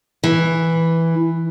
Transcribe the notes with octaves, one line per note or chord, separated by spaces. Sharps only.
E3